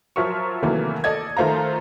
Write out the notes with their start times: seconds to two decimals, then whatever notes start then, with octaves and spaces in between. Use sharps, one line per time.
0.16 F3 F#3 A#4 E5 C#6
0.62 C3 D#3 E3 F#3 A3 A#3
1.04 A4 D5 D#5 G#6
1.37 D#3 F3 A3 C5 F5 A#5